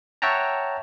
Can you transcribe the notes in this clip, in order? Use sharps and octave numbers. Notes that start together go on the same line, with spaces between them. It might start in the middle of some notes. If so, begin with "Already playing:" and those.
C#5 E5 F#5 G5 A5 A#5